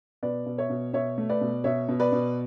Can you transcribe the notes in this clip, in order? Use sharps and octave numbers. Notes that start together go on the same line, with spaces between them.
B2 B4 D5
B2
C#5 E5
B2
B2 C#5 E5
A3
B4 D5
B2
B2 C#5 E5
B2
B4 D5
B2